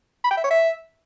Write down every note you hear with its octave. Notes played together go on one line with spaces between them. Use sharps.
B5
G5
E5
C#5
E5